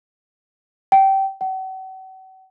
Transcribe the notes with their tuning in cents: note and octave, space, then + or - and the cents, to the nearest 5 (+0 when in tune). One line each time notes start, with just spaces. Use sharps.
G5 -20
F#5 +45